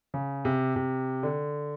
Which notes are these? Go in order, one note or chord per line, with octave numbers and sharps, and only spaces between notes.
C#3
C3
C3
D3